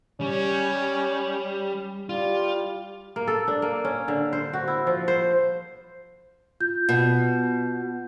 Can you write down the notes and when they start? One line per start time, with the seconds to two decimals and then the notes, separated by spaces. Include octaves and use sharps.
0.21 G3 C#4
2.09 G3 F4
3.16 A#3
3.27 A4
3.48 D4
3.62 A#3
3.85 C#4
4.08 D3
4.33 C5
4.53 F#4
4.68 E4
4.87 F3
5.08 C5
6.60 F4 G6
6.89 B2